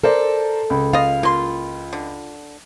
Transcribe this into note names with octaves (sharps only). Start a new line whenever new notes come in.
A4 A#4 C5 D5
C#2
F4 D#5 F5
A#3 F4 C6
D3